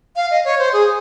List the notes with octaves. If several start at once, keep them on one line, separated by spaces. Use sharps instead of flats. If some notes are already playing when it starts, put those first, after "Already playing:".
F5
D#5
C#5
C5
G#4